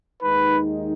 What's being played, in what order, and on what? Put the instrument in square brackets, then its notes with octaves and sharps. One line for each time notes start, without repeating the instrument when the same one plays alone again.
[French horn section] D#2 D#3 G#3 D#4 [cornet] B4